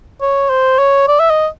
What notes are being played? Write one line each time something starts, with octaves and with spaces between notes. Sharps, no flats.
C#5
C5
C#5
D5
E5
D#5